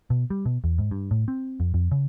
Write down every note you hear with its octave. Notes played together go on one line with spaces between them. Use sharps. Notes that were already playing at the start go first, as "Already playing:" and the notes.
B2
G3
B2
E2
G#2
G2
A2
C4
F2
F2
C#3